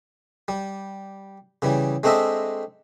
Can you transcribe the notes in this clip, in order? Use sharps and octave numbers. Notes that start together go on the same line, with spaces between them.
G3
C#3 E3 G3
G#3 A3 C4 D4 D#5 E5